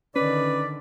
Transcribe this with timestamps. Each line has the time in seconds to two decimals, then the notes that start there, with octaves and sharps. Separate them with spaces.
0.16 D3 D#3 C#4 B4 D5